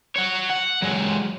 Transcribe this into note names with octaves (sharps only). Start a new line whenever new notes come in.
F#4 C#5
F#5
F#3 G#3